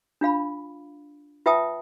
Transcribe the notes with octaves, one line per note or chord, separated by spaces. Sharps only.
D4 F4 F5 B5
F4 B4 E5 G5 A5 D#6